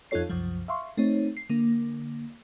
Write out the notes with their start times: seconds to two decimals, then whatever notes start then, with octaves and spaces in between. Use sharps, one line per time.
0.11 F2 D#4 F4 A4 C#5 C7
0.29 C2 F#2 F3
0.68 E5 F5 C6 C#6
0.97 A3 C4 D#4 C#5
1.37 C7
1.49 D3 A#3